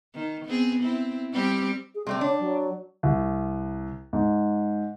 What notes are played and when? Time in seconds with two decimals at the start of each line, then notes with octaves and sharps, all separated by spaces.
0.14 D#3
0.45 B3 C4 G#4
0.82 C4 E4
1.33 G3 C4 G4
1.95 G#4
2.07 C3 G3 A3 C4
2.21 D4 C#5
2.40 F#3
3.03 C2
4.13 G#2